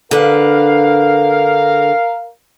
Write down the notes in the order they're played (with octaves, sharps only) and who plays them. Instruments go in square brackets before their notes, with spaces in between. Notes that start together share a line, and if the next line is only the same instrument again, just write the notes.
[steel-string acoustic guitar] D3 B4 [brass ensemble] A#4 F5